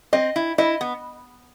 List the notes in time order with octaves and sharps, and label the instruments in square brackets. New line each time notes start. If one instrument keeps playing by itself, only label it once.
[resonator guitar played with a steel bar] C4 [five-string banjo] D#5
[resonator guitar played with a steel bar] E4
[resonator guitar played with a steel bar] E4 [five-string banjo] D#5
[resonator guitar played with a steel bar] B3